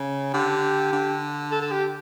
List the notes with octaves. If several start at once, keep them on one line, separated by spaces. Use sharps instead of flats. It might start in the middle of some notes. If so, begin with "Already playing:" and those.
Already playing: C#3
D3 G4
D3
A4
A4
G4